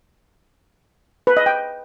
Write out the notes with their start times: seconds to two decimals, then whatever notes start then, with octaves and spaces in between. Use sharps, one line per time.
1.27 B4
1.37 D#5
1.46 G5